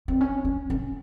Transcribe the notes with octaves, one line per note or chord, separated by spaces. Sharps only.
C4
C#4
C#4
C#4